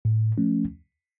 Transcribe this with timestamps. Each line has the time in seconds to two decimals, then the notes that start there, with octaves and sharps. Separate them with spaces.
0.05 A2
0.38 F3 A3 C#4